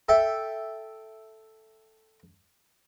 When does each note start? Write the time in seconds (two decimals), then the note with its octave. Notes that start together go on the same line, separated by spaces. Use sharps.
0.09 A4 E5 G5